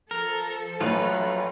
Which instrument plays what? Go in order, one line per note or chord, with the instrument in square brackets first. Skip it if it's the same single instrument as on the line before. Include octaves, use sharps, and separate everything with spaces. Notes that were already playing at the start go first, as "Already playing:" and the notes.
[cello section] F3 A4 [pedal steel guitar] A#4
[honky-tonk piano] A#1 A2 E3 [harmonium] F#3 [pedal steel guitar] F4 B4